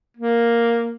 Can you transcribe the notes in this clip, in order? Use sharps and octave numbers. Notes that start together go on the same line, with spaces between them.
A#3